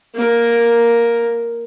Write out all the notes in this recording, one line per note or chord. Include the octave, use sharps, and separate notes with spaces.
A#3 A#4